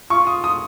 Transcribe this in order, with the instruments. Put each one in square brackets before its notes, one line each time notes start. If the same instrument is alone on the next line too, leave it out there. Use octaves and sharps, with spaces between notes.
[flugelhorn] F4 [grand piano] C#6
[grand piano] D#6
D#6